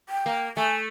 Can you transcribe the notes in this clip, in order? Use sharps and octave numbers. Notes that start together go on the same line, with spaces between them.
G5
A#3
A3 G#5